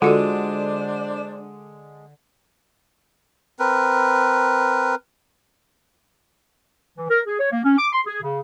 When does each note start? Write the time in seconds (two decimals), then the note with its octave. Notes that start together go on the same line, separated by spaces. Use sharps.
0.02 D3 G#3 D4 F4 F#4 A4 C5 D5
3.59 C4 A#4 B4
6.97 E3
7.10 A#4
7.27 G#4
7.40 C#5
7.52 A#3
7.64 C#4
7.78 D6
7.93 C6
8.06 G#4
8.22 C#3